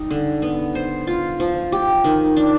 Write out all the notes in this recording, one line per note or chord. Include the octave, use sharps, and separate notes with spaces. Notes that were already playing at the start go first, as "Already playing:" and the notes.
Already playing: G3 D#4
D3
B3
C5
F4
F3
G4
D#3
D4